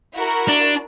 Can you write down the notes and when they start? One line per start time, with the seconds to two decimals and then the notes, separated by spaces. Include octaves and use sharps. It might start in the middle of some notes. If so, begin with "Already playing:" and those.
0.14 E4 F#4 A#4
0.48 D4